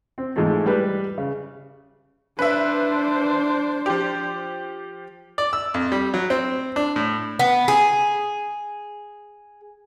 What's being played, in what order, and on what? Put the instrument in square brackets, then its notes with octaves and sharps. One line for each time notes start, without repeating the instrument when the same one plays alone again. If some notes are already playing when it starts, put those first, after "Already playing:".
[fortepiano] C4
G#2 E3 F3 G#3 A3
G3 B4
C#3
[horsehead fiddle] D4 C5 [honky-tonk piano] B4 E5
[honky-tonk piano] F3 G4
[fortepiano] D5
E6
F2
G3
F#3
C4
D4
A2
[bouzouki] B3
G#4